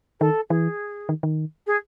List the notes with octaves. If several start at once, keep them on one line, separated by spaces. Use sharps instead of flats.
D#3 A4
E3 G#4
D#3
D#3
G#4